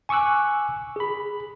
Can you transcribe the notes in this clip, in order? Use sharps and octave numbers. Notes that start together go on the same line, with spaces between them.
G#5 C#6 D6 E6 F#6
G#4 B5